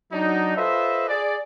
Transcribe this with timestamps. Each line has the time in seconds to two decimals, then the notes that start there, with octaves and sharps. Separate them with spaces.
0.12 F#3 D4 D#4
0.56 F4 A4 B4 C5 D#5 E5
1.09 G#4 D5